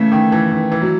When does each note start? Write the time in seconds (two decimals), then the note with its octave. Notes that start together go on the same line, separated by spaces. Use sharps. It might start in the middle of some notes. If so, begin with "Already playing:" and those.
Already playing: C#3 E3 A3
0.12 D#3
0.32 E3
0.52 D#3
0.72 E3
0.82 F#3